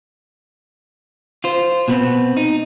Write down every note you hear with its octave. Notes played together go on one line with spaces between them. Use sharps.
F4 C5
B2 B3 C4
D#4